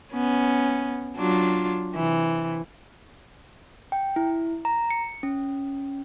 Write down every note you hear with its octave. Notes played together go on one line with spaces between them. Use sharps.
B3 C#4
F#3 D4 F4
C3 E3
G5
E4
A#5
C#7
C#4